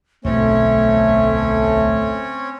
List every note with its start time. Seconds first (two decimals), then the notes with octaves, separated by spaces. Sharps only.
0.25 D1 B1 E2 A3 C4 C#4 C#5 E5